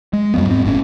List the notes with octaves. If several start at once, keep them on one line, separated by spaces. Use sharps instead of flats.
G#3
F2 F#3 G3 B3
G#2 C4
G1 A2 C#4